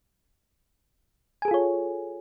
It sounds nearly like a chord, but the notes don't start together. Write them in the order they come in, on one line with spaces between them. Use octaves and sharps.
G#5 G#4 A4 F4 C#5